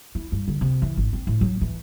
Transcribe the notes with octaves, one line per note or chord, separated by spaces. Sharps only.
E4
G2
D3
C3
E3
G#1
C4
A2
F#3
E3